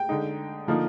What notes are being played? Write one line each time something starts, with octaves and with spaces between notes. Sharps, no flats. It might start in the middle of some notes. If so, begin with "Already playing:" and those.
Already playing: G5
D3 G#3 D#4
D3 F3 A#3 D#4